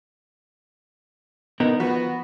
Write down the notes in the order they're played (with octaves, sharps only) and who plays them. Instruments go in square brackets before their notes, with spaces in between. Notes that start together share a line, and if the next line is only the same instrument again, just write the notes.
[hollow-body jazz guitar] B3 D#4 A#4
[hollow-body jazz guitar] F3 [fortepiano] B3 F#4